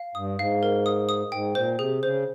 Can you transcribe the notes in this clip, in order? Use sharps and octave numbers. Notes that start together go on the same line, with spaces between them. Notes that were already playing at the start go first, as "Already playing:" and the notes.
Already playing: F5
G2 D#6
G#2 F5
A#4
D#6
D#6
G#2 G5
A#2 C5
C3 G#4
C#3 C5